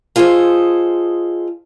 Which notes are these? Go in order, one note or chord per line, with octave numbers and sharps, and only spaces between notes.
F4 G#4 A4 C5 D#5